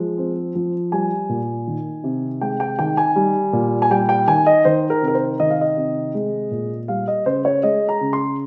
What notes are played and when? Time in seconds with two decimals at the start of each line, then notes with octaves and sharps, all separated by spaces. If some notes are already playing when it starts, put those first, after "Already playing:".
Already playing: F3 G#3
0.18 C4
0.55 F3
0.92 G3 G#5
1.29 A#2
1.67 D#3
2.04 C3
2.41 G#3 G5
2.60 G5
2.79 D#3 G5
2.97 G#5
3.16 G3
3.53 A#2
3.82 G#5
3.90 G3 G5
4.09 G5
4.28 D#3 G#5
4.46 D#5
4.65 D#3 C5
4.90 A#4
5.02 C3
5.08 A#4
5.15 C5
5.40 D#3 D#5
5.50 F5
5.61 D#5
5.77 C3
6.14 G#3
6.51 A#2
6.88 G3 F5
7.08 D#5
7.26 C#3 C5
7.45 C#5
7.63 G#3 D#5
7.89 A#5
8.01 C#3
8.13 C6